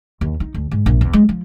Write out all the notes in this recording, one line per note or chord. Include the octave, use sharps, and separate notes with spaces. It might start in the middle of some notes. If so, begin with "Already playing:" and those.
D#2
D#4
D2
G#2
A#1
E2
G#3
F3